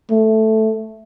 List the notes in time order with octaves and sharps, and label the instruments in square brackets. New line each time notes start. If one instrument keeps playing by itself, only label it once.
[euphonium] A3